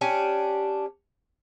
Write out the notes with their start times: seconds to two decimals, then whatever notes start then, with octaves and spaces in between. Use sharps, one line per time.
0.01 C#4 D4 G4